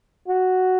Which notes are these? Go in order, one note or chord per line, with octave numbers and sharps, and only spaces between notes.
F#4